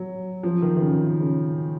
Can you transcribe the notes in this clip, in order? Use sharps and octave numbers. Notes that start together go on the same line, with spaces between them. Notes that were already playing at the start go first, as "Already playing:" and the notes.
Already playing: F#3
F3
D#3
D#3
C#3
C#3